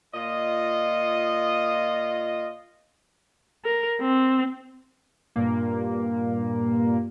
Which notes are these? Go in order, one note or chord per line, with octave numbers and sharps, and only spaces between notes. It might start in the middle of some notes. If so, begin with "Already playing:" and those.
A#2 F4 D#5
A#4
C4
G2 A#2 A#3